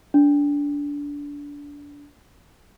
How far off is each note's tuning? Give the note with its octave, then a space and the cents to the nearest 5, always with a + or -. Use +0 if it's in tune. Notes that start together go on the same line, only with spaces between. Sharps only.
D4 -25